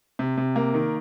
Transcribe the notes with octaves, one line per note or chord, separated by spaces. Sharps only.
C3
C3
A#3
D#3